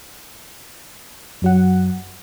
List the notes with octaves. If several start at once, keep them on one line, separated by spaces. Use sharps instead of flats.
F#2 F#3 F#5